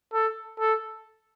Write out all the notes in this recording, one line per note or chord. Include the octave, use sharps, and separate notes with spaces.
A4
A4